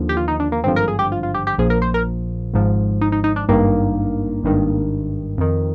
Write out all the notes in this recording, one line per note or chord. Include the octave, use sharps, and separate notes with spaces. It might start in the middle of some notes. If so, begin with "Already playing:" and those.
Already playing: D#2 D3 F3
G4
F4
D#4
D4
A#3
G#1 G2 D3 F3 C4
A#4
G#4
G4
F4
F4
G4
G4
A#1 A#2 F3 G#4
A#4
C5
A#4
G#1 G#2 F3
D#4
D#4
D#4
D4
G#1 G2 D#3 A#3
G#1 G2 D#3
F2 D#3